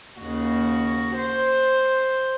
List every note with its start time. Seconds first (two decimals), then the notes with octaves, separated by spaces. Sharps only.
0.20 D#2 C#3 F#4
1.17 C5